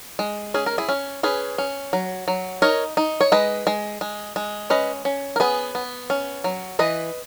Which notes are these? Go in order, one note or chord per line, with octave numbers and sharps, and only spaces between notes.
G#3
C#4 G#4
A#4
E4 G#4
C#4
C#4 G#4 B4
C#4
F#3
F#3
D#4 A#4 C#5
D#4
C#5
G#3 B4 D#5
G#3
G#3
G#3
C#4 B4 D#5
C#4
A#4
B3 G#4 B4
B3
C#4
F#3
E3 B4 D#5